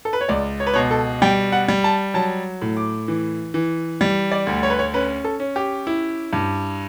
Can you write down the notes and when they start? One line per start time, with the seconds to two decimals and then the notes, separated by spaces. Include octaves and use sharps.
0.05 A4
0.13 B4
0.21 C#5
0.29 C#2 D5
0.60 C#5
0.67 B4
0.74 B2 C#5
0.91 A4
1.22 G3 G5
1.52 F#5
1.68 G3
1.84 A5
2.14 F#3 A5
2.62 A2
2.77 D6
3.08 E3
3.54 E3
4.01 G3
4.31 D5
4.47 D2
4.63 C#5
4.70 B4
4.79 C#5
4.94 C#4 B4
5.24 A4
5.40 C#4
5.56 G4
5.87 E4
6.33 G2